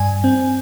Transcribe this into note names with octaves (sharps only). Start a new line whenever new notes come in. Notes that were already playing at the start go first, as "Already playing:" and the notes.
Already playing: G2 G#5
C4